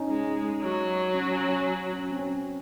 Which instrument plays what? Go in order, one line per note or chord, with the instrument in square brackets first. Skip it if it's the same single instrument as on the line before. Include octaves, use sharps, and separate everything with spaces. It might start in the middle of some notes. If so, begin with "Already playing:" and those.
Already playing: [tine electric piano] C#4 D#4
[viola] G#3
F#3
[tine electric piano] C#4
C#4
C#4
C#4
C4
C#4